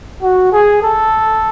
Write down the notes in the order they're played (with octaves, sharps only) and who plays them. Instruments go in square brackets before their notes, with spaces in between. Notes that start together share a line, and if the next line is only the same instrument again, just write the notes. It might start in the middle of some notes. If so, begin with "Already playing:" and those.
[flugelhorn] F#4
G#4
A4